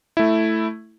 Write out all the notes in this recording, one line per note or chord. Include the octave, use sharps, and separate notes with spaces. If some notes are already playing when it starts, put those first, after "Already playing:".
A3 E4